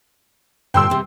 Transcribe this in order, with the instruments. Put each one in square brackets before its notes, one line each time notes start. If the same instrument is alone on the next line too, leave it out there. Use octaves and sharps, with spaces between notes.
[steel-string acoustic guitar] G2 A#2 D3 [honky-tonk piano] G5 C6 E6
[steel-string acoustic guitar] E2 C3